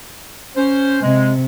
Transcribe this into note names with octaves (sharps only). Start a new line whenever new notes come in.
C#4 C5
C3 G#3